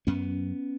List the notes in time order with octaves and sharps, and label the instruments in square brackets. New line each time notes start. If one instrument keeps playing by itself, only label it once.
[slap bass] F#2 B3 C#4